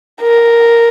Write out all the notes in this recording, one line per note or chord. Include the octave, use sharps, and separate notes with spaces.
A#4